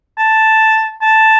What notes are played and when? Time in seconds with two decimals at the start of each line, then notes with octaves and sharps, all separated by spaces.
0.18 A5
1.02 A5